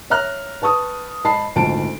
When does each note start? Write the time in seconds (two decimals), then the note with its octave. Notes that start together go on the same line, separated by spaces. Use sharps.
0.10 C#5 E5 A#5 F6 F#6
0.62 B4 A5 C#6 D#6
1.24 G#2 D#4 A5 B5 C7
1.56 G#1 D2 A#2 D#3 A5 D7